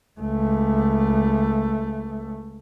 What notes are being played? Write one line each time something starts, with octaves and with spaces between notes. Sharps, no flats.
C#2 A3